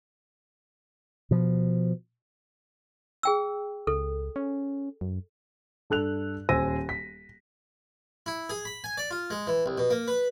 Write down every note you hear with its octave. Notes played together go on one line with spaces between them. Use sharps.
B2 F3
G#4 G5 E6
C#2 A4
C#4
F#2
G2 A4 F#6 F7
D#1 C5 G#5 E6 A#6 D#7
B6
E4
G#4
B5
G#5
D5
F4
G#3
E3
C2
B2
A#3
B4